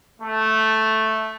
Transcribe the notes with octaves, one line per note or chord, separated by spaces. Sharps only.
A3